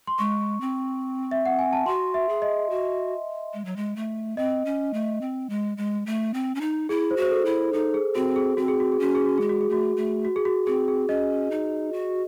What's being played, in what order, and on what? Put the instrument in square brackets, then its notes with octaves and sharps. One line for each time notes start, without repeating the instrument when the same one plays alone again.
[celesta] C6
[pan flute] G#3 [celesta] C#6
[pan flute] C4
[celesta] E5
F#5
G#5
A5
[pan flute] F#4 [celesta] C6
[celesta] E5
[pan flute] G#4
[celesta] D#5
[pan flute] F#4
G#3
F#3
G#3
A3
[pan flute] C4 [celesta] D#5
[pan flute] C#4
A3
C4
G#3
G#3
A3
C4
C#4
D#4
[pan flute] E4 [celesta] G#4
[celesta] C5
[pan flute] F#4
[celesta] C5
A4
[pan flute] E4
[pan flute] D#4 [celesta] A4
[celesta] G#4
[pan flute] C4 [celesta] F#4
[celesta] G#4
[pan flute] C4 [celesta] F#4
[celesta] G#4
F#4
G#4
[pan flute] C#4 [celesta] F#4
[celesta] G#4
F#4
[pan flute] G#3 [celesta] G#4
[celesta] F#4
G#4
[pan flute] A3 [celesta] F#4
[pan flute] A3
[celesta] F#4
G#4
F#4
[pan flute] C4 [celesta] G#4
[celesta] G#4
[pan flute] C#4 [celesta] D#5
[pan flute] D#4
F#4